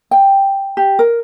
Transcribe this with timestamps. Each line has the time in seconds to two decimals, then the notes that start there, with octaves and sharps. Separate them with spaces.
0.11 G5
0.77 G4
0.99 A#4